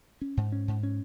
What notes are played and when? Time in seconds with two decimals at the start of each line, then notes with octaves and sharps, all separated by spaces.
0.21 C#4
0.37 G#2
0.52 C#4
0.68 G#2
0.83 C#4